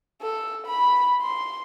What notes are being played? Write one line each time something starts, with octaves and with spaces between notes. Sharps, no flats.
A4
B5
C6